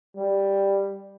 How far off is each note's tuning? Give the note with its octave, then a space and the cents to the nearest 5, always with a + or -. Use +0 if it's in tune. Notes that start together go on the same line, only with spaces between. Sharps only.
G3 +5